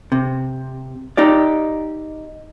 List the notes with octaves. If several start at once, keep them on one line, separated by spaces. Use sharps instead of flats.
C3
D#4 G4 D5